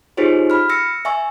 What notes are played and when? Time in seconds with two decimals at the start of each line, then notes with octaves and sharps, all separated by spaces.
0.17 D#4 F4 G4 G#4 C5 C#5
0.50 B5 F6
0.70 E6 A#6 C#7
1.05 E5 G#5 C#6 E6